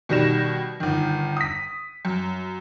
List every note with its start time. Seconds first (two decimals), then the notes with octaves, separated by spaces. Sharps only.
0.09 B2 D#3 G3 A#6 E7
0.80 G1 D#3
1.37 D#6 B6
2.05 F#2